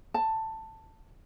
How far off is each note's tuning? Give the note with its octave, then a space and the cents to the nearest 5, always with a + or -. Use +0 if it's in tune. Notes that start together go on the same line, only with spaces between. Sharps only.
A5 +10